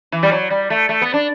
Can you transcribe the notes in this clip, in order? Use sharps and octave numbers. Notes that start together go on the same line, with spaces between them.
E3
G3
F#3
G3
A3
A3
B3
D4